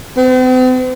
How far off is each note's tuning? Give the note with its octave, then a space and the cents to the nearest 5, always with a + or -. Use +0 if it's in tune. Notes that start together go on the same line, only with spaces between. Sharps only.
C4 -45